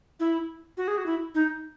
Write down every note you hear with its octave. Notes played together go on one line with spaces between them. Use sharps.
E4
F#4
G#4
F#4
E4
D#4